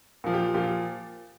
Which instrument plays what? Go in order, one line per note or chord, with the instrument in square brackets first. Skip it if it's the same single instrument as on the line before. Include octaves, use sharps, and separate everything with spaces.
[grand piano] A#2 F3
G4
A#2 F3 G4